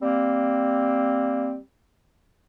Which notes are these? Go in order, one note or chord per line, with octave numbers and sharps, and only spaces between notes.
G3 A#3 C4